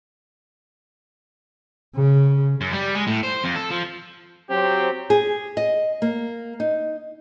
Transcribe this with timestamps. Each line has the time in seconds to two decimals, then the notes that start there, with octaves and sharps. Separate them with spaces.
1.95 C#3
2.61 F#2
2.73 G3
2.95 G#3
3.07 A2
3.23 C5
3.44 F2
3.55 A4
3.70 F3
4.50 F#3 C4 G4
5.10 G#4
5.57 D#5
6.02 A#3
6.60 D#4